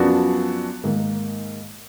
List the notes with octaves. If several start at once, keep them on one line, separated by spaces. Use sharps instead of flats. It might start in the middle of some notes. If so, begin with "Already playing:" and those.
Already playing: F#2 F3 B3 D4 F#4
G#2 D#3 A#3